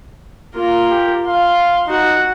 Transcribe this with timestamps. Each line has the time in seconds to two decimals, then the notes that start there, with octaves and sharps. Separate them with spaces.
0.55 A#3 F4 A#4
0.90 G4
1.26 F5 C6
1.88 D#4 F#4 F#5